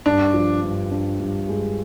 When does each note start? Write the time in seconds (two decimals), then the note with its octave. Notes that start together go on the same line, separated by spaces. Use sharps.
0.06 G2 D4
0.34 F3
0.63 G2
0.91 D4
1.20 G2
1.49 G#3